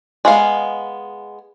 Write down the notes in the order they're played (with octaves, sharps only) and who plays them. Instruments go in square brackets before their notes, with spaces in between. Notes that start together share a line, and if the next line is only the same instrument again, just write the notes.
[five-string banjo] G#3 B3 F5